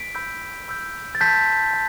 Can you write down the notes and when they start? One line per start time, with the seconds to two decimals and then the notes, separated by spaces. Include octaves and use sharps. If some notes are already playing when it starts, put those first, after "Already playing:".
Already playing: B6 D7
0.15 B5 E6 G6
0.68 B5 E6 G6
1.15 A6
1.21 A5 C6 E6 G6 B6
1.73 A5